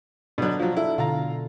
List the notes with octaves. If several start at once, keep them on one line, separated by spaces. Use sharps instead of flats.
B2 D3 F#3 D4
F3 F#3
E4 A4
B2 D3 F4 F5 A#5